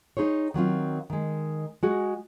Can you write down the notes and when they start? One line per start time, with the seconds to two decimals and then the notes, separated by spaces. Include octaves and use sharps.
0.17 D#4 G#4 C5 C#5
0.54 D#3 F#3 C4 F4
1.10 D#3 G#3
1.83 G#3 F#4 G#4